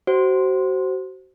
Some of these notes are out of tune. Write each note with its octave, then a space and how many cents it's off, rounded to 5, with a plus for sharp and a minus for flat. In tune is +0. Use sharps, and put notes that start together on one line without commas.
F#4 +35 C5 +0